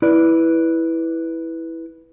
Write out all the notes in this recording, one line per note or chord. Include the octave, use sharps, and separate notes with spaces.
E4 B4 D5